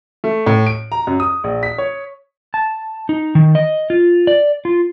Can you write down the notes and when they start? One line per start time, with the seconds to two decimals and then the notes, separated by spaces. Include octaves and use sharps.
0.24 A3
0.46 A2
0.67 D7
0.92 A#5
1.07 F#2
1.20 D#6
1.44 A#1
1.63 B6
1.78 C#5
2.54 A5
3.09 D#4
3.35 D#3
3.55 D#5
3.90 F4
4.27 D5
4.65 F4